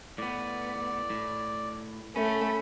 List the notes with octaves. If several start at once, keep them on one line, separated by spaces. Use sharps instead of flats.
A2 B3 D5
A2
A3 C#4 B5